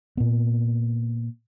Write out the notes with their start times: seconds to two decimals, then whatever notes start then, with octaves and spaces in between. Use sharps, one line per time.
0.17 A#2 B3